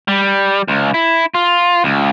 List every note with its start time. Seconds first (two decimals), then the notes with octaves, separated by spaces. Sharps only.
0.08 G3
0.68 C#2
0.94 E4
1.35 F4
1.84 C#2